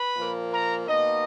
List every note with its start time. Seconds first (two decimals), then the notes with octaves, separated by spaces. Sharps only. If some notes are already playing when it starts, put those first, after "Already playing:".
Already playing: B4 B5
0.17 A#2 F3 A#3
0.52 A#4 A#5
0.87 B2 A#3 D#4 D#5